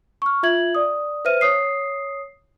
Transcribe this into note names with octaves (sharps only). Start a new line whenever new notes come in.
C#6 F6
F4 E5 G#6 F#7
D5 D#6
B4 C5 E5 F6 D#7
C#5 D#6 C7